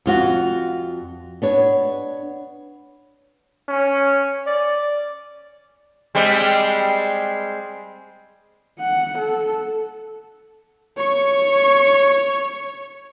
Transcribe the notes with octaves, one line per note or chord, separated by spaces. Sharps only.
F2 F4 F#4
B3 D4 C#5
C#4
D5
G3 G#3 C4
F#5
A4
C#5 C#6